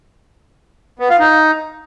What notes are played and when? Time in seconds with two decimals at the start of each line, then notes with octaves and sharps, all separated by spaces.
0.99 B3
1.09 F4
1.20 D#4